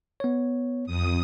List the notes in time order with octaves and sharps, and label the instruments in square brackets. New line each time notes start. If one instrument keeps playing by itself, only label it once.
[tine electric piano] B3 C#5
[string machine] F2 D#6